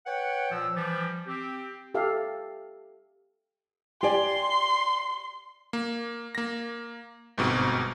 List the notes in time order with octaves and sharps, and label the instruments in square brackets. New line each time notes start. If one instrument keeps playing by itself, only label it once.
[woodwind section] B4 C#5 F#5 G5
A#2 F3 E6
E3 F3 G3
C4 G4
[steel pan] G4 A4 E5 F5
[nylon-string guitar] G4 D5 G#5 [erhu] C6
[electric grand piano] A#3
A#3 A#6
G1 G#2 B2 C4